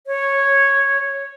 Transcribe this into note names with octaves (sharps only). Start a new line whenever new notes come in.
C#5